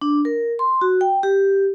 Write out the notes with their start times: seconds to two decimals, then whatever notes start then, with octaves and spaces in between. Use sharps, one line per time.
0.02 D4
0.25 A#4
0.59 C6
0.81 F#4
1.01 G5
1.23 G4